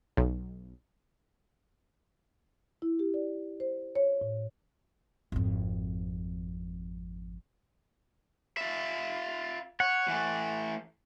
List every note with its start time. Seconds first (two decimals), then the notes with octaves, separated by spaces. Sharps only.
0.17 B1
2.82 E4
2.99 G4
3.14 D5
3.60 C5
3.95 C#5
4.21 A2
5.32 G#1 F2
8.57 F4 E5
9.80 C#5 F#5
10.08 E3 A3